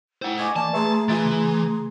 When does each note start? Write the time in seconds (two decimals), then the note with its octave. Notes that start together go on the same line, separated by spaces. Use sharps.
0.22 E4 C5 F#5 G5
0.39 D#5 G#5 C#6 D6 G#6
0.56 E3 A#3 D5 A5
0.73 A3 G#4 B4 E5 A#5 C6 C#6
1.09 E3 F4 G#4 E5 A6
1.25 C#3